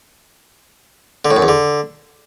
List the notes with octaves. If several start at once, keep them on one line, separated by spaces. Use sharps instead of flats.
D3
A2
F#2
E2
D3